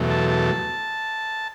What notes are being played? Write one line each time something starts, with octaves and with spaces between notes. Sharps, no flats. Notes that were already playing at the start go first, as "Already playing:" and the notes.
Already playing: E2 B2 F#3 A3
A5
A5